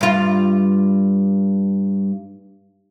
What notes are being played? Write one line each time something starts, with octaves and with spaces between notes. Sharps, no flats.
G2 F4